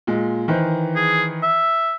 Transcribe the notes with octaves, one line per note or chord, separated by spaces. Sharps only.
A#2 G#3
D#3 E3 C5
G#4
E5